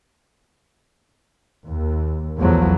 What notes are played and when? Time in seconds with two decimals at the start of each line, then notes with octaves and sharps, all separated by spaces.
1.68 D#2
2.39 B1 E2 F3 F#3 A3